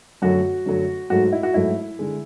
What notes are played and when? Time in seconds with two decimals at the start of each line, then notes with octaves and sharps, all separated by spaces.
0.22 F#2 D3 F#3 A3 F#4
0.66 F#2 D3 F#3 A3
1.10 G#2 F#3 A3 F#4
1.33 E4
1.43 F#4
1.54 G#2 F#3 A3 E4
1.99 D3 G#3